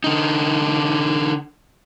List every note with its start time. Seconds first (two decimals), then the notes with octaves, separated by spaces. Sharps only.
0.04 D3 D#4